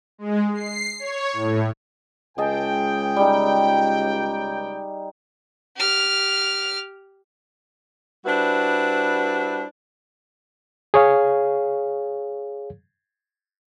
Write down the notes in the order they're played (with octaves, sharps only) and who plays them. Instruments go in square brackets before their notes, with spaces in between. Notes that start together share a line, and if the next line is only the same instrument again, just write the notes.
[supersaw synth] G#3
C7
C#5
A2
[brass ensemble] C#2 G5 [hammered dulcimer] G#4 D#5 A5
[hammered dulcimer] G3 D#4
[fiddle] G4 F6
[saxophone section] G3 D4 E4 F#4 B4 C5
[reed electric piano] G#4 C#5 F5